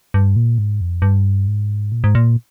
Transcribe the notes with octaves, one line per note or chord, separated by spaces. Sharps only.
G2
A#2
G#2
F2
G2
G#2
A#2
G#2
A#2